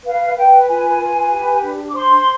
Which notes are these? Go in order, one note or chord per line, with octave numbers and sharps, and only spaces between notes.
B4 F5
B4 G5
F4 G#5
B4
G4
D4
D6
C5 C6